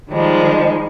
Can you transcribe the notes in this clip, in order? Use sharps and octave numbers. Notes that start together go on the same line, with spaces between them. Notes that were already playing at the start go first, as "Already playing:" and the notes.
D#3 F3 G3 G#3